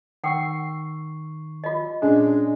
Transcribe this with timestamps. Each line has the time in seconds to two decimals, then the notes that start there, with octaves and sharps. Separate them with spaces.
0.24 D#3 F#5 G5 C#6 E6 C7
1.64 F4 D#5
2.02 A#2 G#3 C#4 D4